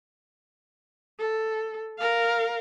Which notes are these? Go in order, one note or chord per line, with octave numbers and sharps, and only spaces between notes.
A4
A#4 F5